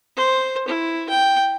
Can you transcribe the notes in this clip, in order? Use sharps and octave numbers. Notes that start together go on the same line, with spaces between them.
C5
E4
G5